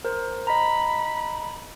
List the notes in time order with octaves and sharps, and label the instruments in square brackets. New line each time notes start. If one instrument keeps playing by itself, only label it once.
[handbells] A#4 C5
[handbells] D#5 A#5 [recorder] B5